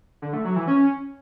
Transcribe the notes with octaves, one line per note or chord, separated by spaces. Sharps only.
D3
A3
F#3
E3
C#4